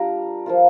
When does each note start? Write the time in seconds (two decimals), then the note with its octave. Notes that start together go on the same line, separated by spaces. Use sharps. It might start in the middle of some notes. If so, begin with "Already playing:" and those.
Already playing: G3 A#3 D4 F4 A#5
0.46 F3 A#3 F4